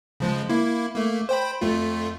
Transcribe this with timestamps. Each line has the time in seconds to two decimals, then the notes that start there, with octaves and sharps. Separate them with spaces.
0.20 C#3 F3 G#3
0.49 A#3 E4
0.95 A3 A#3
1.29 C5 G5 B5
1.61 F2 A3 F4